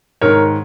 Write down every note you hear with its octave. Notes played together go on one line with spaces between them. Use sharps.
G#2 D#3 A#4 C#5